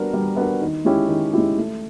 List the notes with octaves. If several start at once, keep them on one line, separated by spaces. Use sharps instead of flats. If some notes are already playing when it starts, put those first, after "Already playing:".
Already playing: G3 B3 D4 F#4 A#4
G3
B3 D4 F#4 A#4
D#3
G#3 C#4 E4 G4
D#3
G#3 C#4 E4 G4
A3